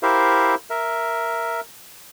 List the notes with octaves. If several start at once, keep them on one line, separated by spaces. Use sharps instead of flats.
E4 G4 A#4 C5 E5 F5
A#4 E5